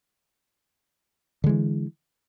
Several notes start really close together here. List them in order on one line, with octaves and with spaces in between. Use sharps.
D3 G#3 E3